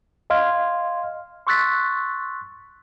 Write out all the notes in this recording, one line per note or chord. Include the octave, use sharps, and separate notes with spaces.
D#5 F5 C6 F6 G#6
C6 C#6 E6 F#6 A6 B6